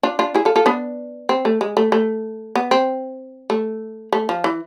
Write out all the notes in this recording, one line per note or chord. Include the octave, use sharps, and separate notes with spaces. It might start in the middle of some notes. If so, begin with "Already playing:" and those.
D4 F4
D4 F4
E4 G#4
F4 A4
F4 A4
B3 D4
C4
A3
G#3
A3
A3
B3
C4
A3
A3
F3
E3